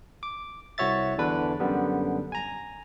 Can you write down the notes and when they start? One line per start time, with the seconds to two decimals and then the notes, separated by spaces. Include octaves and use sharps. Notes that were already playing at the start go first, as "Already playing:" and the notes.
0.23 D6
0.78 C2 F#4 C#5 E5 A6
1.18 E2 D3 D4 B4
1.60 F#2 D3 G3 B3
2.32 G#5 A#5